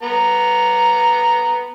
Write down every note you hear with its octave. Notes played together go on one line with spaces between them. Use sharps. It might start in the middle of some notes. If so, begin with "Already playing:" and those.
B3 A#5